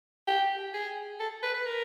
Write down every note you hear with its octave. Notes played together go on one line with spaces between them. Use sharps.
G4
G#4
A4
B4
B4
A#4